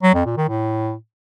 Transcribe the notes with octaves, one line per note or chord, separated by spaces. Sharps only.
F#3
F2
A#2
D#3
A2